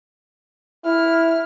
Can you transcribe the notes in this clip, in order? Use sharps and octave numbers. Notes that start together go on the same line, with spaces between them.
E4 F6